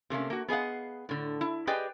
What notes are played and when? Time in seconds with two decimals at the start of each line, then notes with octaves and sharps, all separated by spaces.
0.10 C3 A3 A#3 C#4
0.30 A#3 F#4
0.48 B3 G#4 D#5 F5 F#5
1.09 A2 D3
1.41 E4
1.67 G4 G#4 B4 D5 D#5 G5